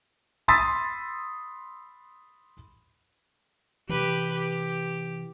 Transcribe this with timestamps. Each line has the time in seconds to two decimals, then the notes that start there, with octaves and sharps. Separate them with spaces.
0.48 B5 C6 D#6 E6 A6 B6
3.89 C3 E3 G4 B4
4.35 G4